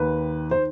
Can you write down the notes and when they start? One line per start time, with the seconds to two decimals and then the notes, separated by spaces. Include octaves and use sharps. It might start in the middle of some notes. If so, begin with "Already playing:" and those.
Already playing: D#2 D#3 B4
0.51 D#3 C5